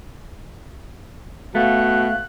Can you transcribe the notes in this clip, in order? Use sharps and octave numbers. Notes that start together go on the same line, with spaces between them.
B2 A3 F5 F#6